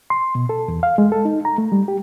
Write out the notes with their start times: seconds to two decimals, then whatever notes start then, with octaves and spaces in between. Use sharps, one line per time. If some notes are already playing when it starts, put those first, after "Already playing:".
0.10 C6
0.35 B2
0.49 A4
0.68 E2
0.83 F5
0.98 G#3
1.12 A4
1.25 D#4
1.45 A#5
1.58 A3
1.72 G3
1.88 G4